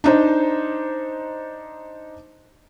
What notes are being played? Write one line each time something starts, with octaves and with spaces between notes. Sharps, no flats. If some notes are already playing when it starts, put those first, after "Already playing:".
D4 D#4 C5